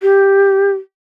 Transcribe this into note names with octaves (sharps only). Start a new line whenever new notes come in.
G4